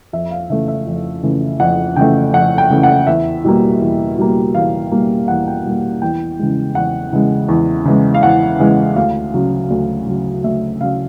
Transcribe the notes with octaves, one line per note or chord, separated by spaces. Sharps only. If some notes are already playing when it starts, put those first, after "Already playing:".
F2 E5
F5
C#3 E3 A3 E5
E5
F2
C#3 E3 A3
F2 F#5
C#3 E3 A3 G5
F2 F#5
G5
C#3 E3 A3
F#5
E2 E5
B2 G3 A#3
E2
B2 G3 A#3
E2 F5
B2 G3 A#3
E2 F#5
G5
B2 G3 A#3
E2 G5
C#3 E3 G#3
E2 F#5
C#3 E3 G#3
E2
C#3 E3 G#3
F5
E2 F#5
C#3 E3 G#3
D2 F5
C#3 F#3
D2
C#3 F#3
D2 E5
C#3 F#3 F5